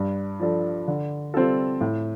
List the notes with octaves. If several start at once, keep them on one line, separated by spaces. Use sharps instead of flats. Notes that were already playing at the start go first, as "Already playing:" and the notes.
Already playing: G2
F3 D4 A4
D3
G3 C4 F4 A4
A2